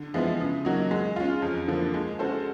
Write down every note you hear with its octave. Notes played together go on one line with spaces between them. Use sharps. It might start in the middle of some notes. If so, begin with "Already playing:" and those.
Already playing: D3
F3 G#3 B3 E4
C#3
F#3 A#3 D#4 F#4
G#3
C#4 F4
F2
D3 F3 A#3
G#3
C#4 F#4 A4 C5